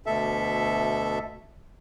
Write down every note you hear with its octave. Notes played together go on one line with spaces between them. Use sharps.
D2 B2 A4 E5